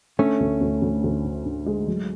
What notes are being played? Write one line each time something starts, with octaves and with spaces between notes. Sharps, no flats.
D3 A3 C#4
D2
D2
D2
D2
D3
D3
G#3
F#3